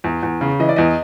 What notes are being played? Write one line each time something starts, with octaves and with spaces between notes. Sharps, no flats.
E2
E2
C#3
E3 D#5
D5
E2 D#5